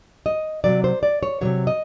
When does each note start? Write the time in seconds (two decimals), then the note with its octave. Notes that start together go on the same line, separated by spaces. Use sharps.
0.26 D#5
0.64 C3 D#3 F#3 D5
0.84 C5
1.03 D5
1.23 C#5
1.41 D#3 F#3 C#5
1.45 C3
1.67 D#5